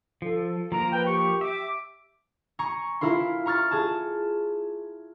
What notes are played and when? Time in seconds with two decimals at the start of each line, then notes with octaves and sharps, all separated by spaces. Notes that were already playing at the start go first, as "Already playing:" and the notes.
0.22 F3 A4
0.72 F3 A#3 A#4 A#5
0.91 B4 G5
1.06 G4 C#6
1.41 E5 D6
2.59 G#5 A#5 C#6
3.01 E4 F4 A#4 C6
3.46 A#5 C#6 F6 A6
3.71 G#4 A5